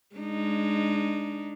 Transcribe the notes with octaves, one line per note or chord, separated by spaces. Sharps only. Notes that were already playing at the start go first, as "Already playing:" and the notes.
G#3 D4 D#4